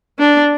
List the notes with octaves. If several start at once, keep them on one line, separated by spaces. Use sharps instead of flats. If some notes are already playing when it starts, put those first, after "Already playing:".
D4